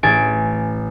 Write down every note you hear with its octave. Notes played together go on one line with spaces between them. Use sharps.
A1 G#5 A6 D7